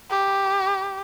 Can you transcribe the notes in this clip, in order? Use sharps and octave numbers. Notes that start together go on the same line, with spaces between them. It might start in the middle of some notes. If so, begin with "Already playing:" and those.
G4